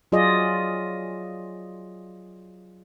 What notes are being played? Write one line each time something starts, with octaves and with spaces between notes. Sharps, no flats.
F#3 F4 G#4 D5 D#5